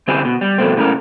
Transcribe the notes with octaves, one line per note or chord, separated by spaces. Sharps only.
D3 C4 E4 G4 G#4
B2
G3
F2 B2 A3 C4
C#2 A2 C#3 A#4